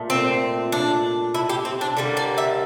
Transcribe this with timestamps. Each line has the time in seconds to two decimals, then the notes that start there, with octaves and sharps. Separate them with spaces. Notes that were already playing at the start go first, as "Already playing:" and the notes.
Already playing: A#2 A3
0.10 C4
0.72 D4
1.35 E4
1.50 G4
1.65 C4
1.81 D4
1.97 D3 G3 A#3
2.17 D5
2.38 E5